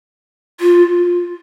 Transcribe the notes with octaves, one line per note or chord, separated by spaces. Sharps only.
F4